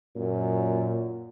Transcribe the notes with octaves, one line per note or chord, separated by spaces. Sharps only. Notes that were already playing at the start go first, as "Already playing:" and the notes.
F#2 A#2